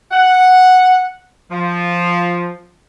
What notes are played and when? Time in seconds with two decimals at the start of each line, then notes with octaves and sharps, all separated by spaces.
0.12 F#5
1.51 F3